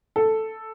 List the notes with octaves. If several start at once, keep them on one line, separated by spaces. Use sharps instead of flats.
A4